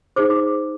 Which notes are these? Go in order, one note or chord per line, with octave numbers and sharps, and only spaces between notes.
D#4 G#4 C5 D6
D6